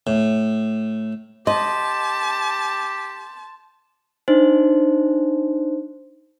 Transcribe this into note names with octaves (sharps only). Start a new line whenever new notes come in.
A2
G4 D#5 A5 C6
D4 D#4 C5